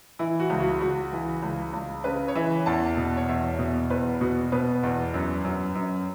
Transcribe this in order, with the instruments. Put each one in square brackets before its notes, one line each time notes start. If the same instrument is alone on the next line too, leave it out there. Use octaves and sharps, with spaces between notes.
[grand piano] E3 E4
F#4
C#2
F#4
C#2 F#4
E3
C#2
C#2
C#3 B4
C#5
E3 E5
E2 A5
B2
C#5
E2 E5
B2
E2 B4
B2 F#4
B2 B4
E2
F#2
F#2
F#2